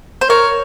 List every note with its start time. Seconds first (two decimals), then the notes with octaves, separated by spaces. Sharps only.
0.21 C5
0.29 A#4 C#5